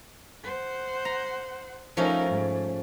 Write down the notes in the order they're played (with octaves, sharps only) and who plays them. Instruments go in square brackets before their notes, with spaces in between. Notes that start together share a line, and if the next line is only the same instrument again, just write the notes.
[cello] C5 F#5
[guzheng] A#5
[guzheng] F3 A3 C#4 [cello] D#4 A#4
[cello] G#2